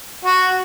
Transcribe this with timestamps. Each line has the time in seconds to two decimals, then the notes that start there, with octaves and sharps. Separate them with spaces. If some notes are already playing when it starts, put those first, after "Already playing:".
0.25 F#4